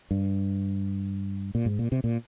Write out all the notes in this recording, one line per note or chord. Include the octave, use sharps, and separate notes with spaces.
G2
A#2
G#2
A#2
C3
A#2